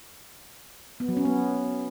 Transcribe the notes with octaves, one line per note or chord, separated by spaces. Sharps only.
B3
F#3
C#4
B3